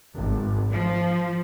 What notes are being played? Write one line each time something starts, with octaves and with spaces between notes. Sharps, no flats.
G#1
F3